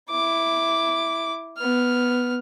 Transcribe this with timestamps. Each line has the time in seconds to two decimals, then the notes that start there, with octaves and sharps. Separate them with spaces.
0.10 E4 D6
1.58 B3 F6